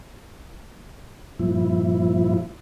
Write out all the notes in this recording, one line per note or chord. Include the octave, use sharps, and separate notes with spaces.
G2 A#2 F3 E4